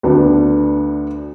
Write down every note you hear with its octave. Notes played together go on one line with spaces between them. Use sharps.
D2 B3 D4